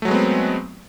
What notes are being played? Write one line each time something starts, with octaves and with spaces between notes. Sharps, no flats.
F#3 G#3 A3 B3 C4